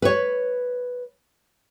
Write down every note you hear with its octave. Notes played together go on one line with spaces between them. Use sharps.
B4 C#5